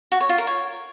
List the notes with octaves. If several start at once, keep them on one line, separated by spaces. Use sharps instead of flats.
F#4
C#5
F4
A#4
C#5